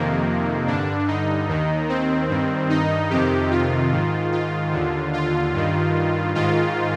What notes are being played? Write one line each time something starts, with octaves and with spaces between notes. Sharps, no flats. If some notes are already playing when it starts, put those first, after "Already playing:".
Already playing: F2 C3 D#3 A#3
G2 D3 D4
D#4
D#2 D#3
C4
G2 D#3
D#4
F2 C3 D#3 G4
F4
G#2 D#3
F4
D#2 D3
F4
G2 D#3
G#2 D#3 F4